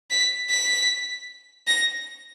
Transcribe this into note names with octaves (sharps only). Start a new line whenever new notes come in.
B6
B6
A#6